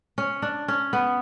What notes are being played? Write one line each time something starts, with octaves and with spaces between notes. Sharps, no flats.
C#4
D4
C#4
B3